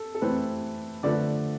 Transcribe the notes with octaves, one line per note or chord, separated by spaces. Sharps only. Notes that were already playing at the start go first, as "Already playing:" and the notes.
Already playing: A4
A4
E3 A3 C4 B4
D3 F3 A3 B4 D5